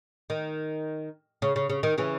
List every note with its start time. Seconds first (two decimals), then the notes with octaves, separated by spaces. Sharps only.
0.30 D#3
1.42 C#3
1.56 C#3
1.70 C#3
1.83 D#3
1.98 C#3 E3